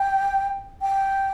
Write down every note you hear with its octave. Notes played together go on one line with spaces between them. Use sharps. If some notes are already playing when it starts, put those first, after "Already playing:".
Already playing: G5
G5